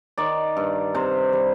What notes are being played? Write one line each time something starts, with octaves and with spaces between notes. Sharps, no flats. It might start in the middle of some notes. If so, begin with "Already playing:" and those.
D#3 D5
G2
C3 C5
G3